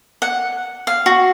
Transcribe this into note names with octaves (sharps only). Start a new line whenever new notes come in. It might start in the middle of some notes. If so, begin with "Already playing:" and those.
F#5
F5
F#4